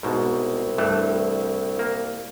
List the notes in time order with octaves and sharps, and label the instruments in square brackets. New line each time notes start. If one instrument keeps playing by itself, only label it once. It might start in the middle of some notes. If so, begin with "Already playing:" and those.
[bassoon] C2 [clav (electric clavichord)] G#2 B2
[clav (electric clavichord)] G2 E3 A3
A#3